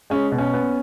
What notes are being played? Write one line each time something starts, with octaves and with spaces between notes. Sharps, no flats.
G#3 C#4
B2
C#4
B3